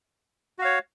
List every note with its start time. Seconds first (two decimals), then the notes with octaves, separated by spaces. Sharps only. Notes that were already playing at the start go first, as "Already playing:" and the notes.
0.59 F#4
0.62 F5
0.65 C#5